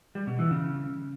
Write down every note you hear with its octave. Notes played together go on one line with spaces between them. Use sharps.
G3
B2
E3
C#3